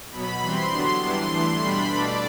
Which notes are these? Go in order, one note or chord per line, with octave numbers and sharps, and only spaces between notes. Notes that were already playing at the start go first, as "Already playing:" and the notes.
B2 F#3 B3 B5
E3 G3 C4 C6
D3 F#3 B3 D4
E3 G3 B3 D4
E3 A3 D4
B2 G3 D4 B5
B2 A3 D4 D5